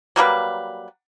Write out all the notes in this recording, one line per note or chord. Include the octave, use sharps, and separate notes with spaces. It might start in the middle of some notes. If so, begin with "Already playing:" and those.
F#3 G3 A#3 B4